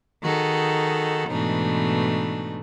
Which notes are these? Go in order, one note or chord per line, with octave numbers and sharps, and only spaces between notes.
D#3 D#4 F#4 G#4 A4
G#2 B2 E3 A3 D4 D#4